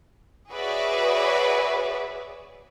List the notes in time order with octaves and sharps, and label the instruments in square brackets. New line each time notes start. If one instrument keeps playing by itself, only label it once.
[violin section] F#4 G#4 B4 C#5 D5 E5